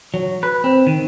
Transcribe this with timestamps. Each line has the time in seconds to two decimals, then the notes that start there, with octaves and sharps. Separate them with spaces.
0.14 F#3
0.43 B4
0.64 C4
0.87 D#3